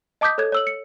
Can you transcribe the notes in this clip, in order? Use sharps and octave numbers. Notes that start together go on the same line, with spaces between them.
D#5 A5 D6 D#6 G6 B6
A4 C#5 F#6 G#6
C#5 E6 F#7
C#7